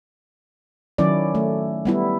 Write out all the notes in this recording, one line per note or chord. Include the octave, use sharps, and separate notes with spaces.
D#3 F#3 C#4 E4 D5
A3
G3 B3 E4